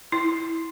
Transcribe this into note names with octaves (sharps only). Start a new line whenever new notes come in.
E4